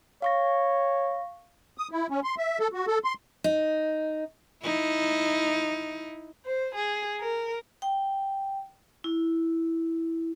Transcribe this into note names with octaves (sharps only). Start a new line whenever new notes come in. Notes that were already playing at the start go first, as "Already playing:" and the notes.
C#5 F5 C#6 A#6
D#6
E4
C#4
C6
E5
A4
F#4
A4
C6
D#4
D#4 E4
C5
G#4
A#4
G5
E4